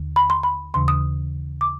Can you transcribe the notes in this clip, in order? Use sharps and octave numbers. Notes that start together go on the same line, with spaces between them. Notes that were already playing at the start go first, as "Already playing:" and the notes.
Already playing: D#2 D3
B5
C6
B5
D#2 C#3 E3 C6
D#6
D6